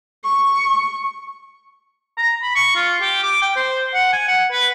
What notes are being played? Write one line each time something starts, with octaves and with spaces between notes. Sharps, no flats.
C#6
A#5
B5
C#6
F4
G4
D6
G5
C5
F#5
G#5
F#5
B4